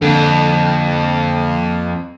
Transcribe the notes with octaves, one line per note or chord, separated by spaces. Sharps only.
F2 D3 A#3